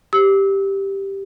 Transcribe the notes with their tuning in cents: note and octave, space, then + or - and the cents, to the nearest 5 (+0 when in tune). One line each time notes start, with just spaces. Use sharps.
G4 +0 E6 -30